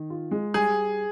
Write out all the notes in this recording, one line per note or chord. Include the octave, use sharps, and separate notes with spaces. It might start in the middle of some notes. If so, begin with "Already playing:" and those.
Already playing: D#3
F4
G#3
G3 G#4